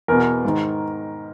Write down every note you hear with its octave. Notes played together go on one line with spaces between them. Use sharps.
E2 B2 A#4
G#2 D#3